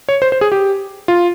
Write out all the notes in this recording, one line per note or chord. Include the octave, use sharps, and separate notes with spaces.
C#5
C5
C5
G#4
G4
F4